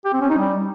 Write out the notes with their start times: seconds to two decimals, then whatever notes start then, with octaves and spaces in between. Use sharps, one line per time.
0.05 G4
0.13 C4
0.21 C#4
0.30 D#4
0.38 G3